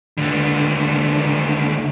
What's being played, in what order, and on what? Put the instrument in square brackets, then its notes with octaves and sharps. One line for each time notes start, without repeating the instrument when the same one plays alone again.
[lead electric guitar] C#2 D3